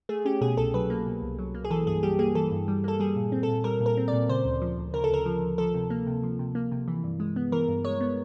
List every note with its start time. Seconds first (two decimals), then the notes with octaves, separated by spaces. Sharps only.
0.09 A3 G#4
0.25 C#4 G4
0.41 B2 G#4
0.57 C2 A4
0.74 F#3 B4
0.90 A#3
1.06 B2
1.22 C2
1.39 F#3
1.55 A#3
1.65 G#4
1.70 E3 A4
1.87 G2 G#4
2.03 G3 G4
2.19 A#3 G#4
2.35 E3 A4
2.51 G2
2.68 G3
2.84 A#3 A4
3.00 G3 G#4
3.16 A#2
3.32 C4
3.43 A4
3.48 A#2
3.64 G3 A#4
3.80 A#2
3.86 A#4
3.97 C4
4.08 D5
4.13 A#2
4.29 C#3 C5
4.45 D2
4.62 F3
4.78 D2
4.94 C#3 A#4
5.04 A4
5.10 D2 A#4
5.26 F3
5.42 D2
5.58 F3 A4
5.74 C3
5.90 A#3
6.07 C3
6.23 F3
6.39 C3
6.55 A#3
6.72 C3
6.88 E3
7.04 G2
7.20 G#3
7.36 B3
7.52 E3 A#4
7.68 G2
7.85 G#3 C#5
8.01 B3